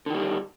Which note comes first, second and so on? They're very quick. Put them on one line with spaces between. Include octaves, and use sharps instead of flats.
D3 D#3 G3